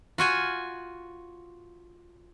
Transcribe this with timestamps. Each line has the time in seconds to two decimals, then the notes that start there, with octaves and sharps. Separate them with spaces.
0.18 F4 F#4 G#5